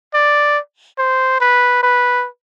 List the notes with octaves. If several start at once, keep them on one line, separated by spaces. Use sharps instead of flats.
D5
C5
B4
B4